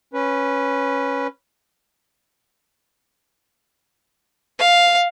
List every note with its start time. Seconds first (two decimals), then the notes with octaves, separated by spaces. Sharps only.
0.14 C#4 B4
4.59 F5